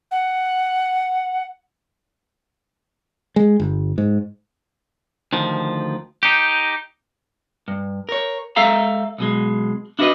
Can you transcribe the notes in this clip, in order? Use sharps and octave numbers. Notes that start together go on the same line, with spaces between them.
F#5
G#3
G1
G#2
D2 D#3 F3
D#4 G4
G2
A#4 C#5
G#3 A4 E5 F5 A#5
B1 B2 G#3
D4 E4 F#4 G#4 B4 D#5